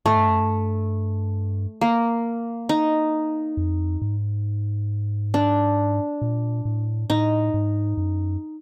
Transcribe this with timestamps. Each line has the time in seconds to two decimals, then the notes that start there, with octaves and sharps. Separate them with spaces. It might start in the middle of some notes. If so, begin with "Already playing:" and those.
0.05 G#2 A3
0.16 G2
0.29 F#2
0.40 G2
1.81 A#3
2.69 D#4
3.57 F2
4.02 G#2
5.34 D4
6.22 A#2
6.65 A2
7.10 A2 D#4
7.54 G#2
7.97 F#2